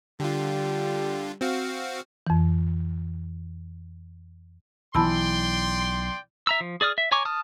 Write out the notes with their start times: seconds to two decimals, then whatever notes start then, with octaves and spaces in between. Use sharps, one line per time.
0.20 D3 G3 F4
1.41 C4 F#4 F5
2.27 F2 E3
4.95 B1 E3 D5 G5 A5 B5 C6 E6
6.47 E5 A#5 E6
6.60 F3
6.81 G#4 D5 D#6 F6
6.98 E5
7.11 C#5 G#5 A#5 C#6 D6
7.25 A5 D#6 F6